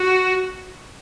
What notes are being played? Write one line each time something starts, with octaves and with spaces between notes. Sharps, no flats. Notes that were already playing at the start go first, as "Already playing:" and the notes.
Already playing: F#4